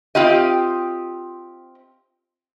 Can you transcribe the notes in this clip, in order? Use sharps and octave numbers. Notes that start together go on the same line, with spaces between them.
C4 F4 G4 D#5